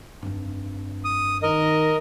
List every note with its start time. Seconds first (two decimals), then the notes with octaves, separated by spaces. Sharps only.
0.23 F1 G2 C4
1.05 D#6
1.43 D#3 A#4 D#5